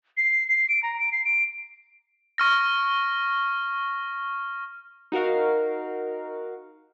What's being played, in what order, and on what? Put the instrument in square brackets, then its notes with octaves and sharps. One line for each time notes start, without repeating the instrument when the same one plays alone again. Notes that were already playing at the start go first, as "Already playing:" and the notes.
[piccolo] C7
C7
D7
A#5
D7
C7
D7
[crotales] C#6 F6 A#6
[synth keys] D#4 F#4 A#4 F5